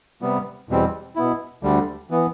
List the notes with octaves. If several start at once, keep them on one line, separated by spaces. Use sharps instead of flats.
C3 G3 B3
E2 B2 G3 C4
B2 B3 E4
D2 D3 G3
E3 B3